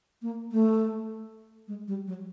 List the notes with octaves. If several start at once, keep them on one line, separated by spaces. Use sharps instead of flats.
A#3
A3
G#3
G3
F#3